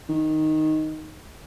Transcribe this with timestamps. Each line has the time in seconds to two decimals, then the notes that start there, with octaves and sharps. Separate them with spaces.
0.09 D#3